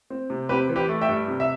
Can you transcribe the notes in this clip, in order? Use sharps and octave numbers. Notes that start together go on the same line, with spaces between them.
C4
C3
C4 G4 B4
E3
G4 B4
A3
E5 G5
G2
C3
E5